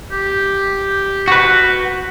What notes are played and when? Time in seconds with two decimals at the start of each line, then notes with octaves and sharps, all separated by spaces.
0.12 G4
1.28 F#4 B4